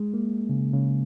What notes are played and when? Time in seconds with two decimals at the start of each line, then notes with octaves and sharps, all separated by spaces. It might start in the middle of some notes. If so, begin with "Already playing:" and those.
Already playing: G#3
0.14 A#3
0.49 C#3
0.73 C#3